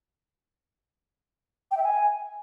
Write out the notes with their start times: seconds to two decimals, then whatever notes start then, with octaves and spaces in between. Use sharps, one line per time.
1.71 G5
1.77 E5
1.83 G#5